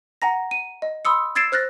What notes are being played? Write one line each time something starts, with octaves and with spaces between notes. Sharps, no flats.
F#5 G#5 A#5 A#6
D#7
D#5
B5 C6 D#6 E6 C#7
E6 G#6 A6 C7 D7 E7
C5 F6 F#6 A6 A#6